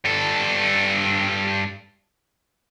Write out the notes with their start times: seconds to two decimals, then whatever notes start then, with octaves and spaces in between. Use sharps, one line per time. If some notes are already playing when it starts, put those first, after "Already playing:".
0.05 G2 A4